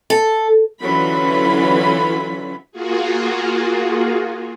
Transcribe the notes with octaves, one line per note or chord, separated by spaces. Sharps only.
A4
D3 E3 F#3 C#4 F4 B5
A#3 F4 F#4 G#4